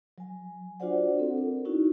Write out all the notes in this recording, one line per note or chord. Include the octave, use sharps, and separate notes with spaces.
F#3 G#5
D4 F4 F#4 C5 D5 F#5
C4 F4 A4
A#4
C#4 D#4 E4 F#4